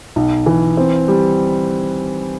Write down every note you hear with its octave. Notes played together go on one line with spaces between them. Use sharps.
B1
E3
C4
G3